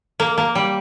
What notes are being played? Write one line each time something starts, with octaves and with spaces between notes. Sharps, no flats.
A#3
A#3
G3